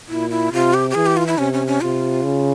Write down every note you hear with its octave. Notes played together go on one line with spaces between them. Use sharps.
A#2 E4
E4
C3 F4
G4
G4
E3 G#4
G4
F4
E4
C3 C#4
C#4
C#4
C3 F4
C#3